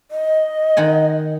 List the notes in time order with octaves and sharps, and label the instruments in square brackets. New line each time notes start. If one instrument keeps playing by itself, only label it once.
[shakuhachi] D#5
[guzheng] D#3 F#5 G#5